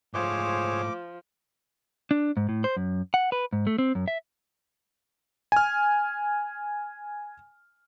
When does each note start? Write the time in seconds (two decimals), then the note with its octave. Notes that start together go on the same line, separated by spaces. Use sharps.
0.14 G#2 F3 A3 G#4 C5 C#5 D6
2.11 D4
2.37 G#2
2.49 A2
2.64 C5
2.77 F#2
3.14 F#5
3.32 B4
3.53 G#2
3.67 A3
3.78 C4
3.95 F#2
4.08 E5
5.52 G#5 F6